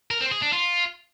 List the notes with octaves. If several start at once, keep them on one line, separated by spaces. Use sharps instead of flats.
A#4
C4
G#4
D4
F4